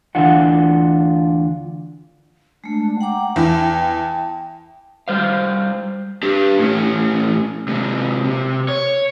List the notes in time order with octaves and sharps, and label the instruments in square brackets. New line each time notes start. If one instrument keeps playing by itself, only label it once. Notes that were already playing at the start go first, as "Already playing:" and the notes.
[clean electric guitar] D2 E3 D4 F4 F#5
[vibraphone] G#3 A3 [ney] D4
[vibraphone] F#5 A#5 D6 [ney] G5
[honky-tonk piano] E2 [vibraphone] E5 A5
[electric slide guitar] G3 C5 F5
[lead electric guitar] D4 G4
A2 C#4
C3 G#3
C3
C#5